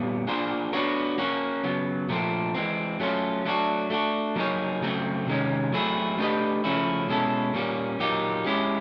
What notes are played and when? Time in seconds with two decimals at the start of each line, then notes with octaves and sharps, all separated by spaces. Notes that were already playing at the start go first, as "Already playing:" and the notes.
Already playing: A#2 G3 B3
0.27 A#3 D4 F4 G#4 C5
0.73 B3 D4 F#4 A#4 C#5
1.18 A#3 C#4 F#4
1.64 C#3 F#3 B3
2.09 A#2 F3 A3 C4
2.54 E3 G#3 C4
3.00 F#3 A3 C#4 F4
3.45 F#3 A3 D4 F#4
3.90 A3 D4 F#4
4.36 F#3 A#3 D#4 G#4 C#5
4.82 C#3 F#3 A3 C4
5.27 C3 D#3 G#3 C#4
5.73 F#3 A3 C4 E4 G#4
6.18 A3 D4 G4 B4 D#5
6.64 C#3 F3 A3 C#4 E4
7.09 B2 G#3 C#4 E4 A4
7.54 A#2 G3 A#3 C#4
7.99 A#2 F#3 A#3 D#4 G4
8.45 G#3 C#4 E4 G4